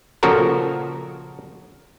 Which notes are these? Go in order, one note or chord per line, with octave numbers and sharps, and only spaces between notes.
A#2 C#3 F3 F#4 A4 A#4